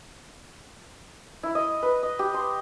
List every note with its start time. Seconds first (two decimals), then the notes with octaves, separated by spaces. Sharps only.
1.43 E4
1.55 D#5
1.82 B4
2.03 D#5
2.19 G4
2.34 C6